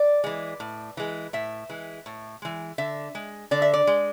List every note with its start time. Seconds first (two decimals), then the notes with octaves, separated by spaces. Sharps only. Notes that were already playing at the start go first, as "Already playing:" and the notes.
Already playing: D5
0.24 E3 G#3
0.60 A2
0.97 E3 G#3
1.33 A2 E5
1.69 E3 G#3
2.06 A2
2.42 E3 G#3
2.78 D3 E5
3.15 G#3
3.51 D3 D5
3.62 E5
3.74 D5
3.87 G#3